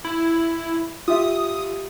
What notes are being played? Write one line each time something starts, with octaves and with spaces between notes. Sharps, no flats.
E4
F4 G4 E5 D#6